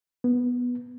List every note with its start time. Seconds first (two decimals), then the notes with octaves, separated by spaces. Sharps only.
0.24 B3